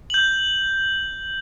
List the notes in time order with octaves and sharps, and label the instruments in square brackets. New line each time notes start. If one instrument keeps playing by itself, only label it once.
[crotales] G6 F#7